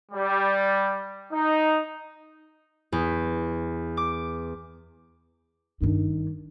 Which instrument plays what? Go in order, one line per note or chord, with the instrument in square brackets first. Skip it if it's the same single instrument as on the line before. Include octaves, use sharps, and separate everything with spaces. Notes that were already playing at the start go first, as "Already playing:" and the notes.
[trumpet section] G3
D#4
[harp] E2
D6
[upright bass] G2 D4 [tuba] D#3